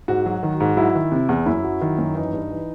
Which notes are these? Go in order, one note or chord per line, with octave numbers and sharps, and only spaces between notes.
G#2 F#4
F#3
D#3
G#2
F#3 E4
D#3
C3
E2
F#2 E4
F#3
D#3
F#2
E3 D#4
G2
E3